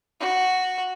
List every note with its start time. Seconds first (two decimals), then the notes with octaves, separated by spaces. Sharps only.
0.21 F#4